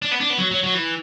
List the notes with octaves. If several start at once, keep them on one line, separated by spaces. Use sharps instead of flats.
D4
B3
D4
B3
F#3
F#3
F#3
E3